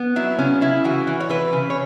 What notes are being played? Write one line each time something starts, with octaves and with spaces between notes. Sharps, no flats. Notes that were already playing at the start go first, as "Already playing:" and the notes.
Already playing: B3
F#3 E4
C#3 C#4
C#3 E4
E3 F#4
E3
C#5
E3 B4
C#3
C#5